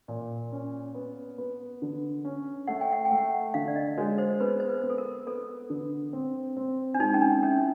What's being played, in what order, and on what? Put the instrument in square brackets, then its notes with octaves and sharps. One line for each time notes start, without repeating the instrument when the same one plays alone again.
[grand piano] A#2
C#4
B3
B3
D3
C#4
[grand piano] A3 [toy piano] F#5
[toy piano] G5
F#5
G5
[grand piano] A3
[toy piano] F#5
[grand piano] D3 [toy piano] F5
[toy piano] D5
D#5
[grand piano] G#3 [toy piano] C#5
[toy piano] C5
[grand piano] B3 [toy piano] B4
[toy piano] C5
B4
[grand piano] B3
[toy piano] A4
A#4
[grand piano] B3 [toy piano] A4
[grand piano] D3
C4
C4
[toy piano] D4
[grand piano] G#3 [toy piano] D#4
[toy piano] C#4
D4
[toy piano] C#4 [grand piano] E4